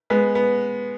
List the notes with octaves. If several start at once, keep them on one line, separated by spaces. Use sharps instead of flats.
G#3 B3
B3